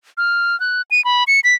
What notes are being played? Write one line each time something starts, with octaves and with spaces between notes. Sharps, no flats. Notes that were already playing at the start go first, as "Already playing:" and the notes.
F6
F#6
D#7
B5
C#7
B6